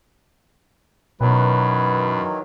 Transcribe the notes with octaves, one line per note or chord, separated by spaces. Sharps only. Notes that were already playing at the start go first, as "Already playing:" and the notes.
F#2 B2 D#3 E3 F#3 B4